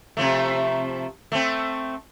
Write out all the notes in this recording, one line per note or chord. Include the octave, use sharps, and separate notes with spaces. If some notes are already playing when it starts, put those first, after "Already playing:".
C3 F3 A3
A3 C4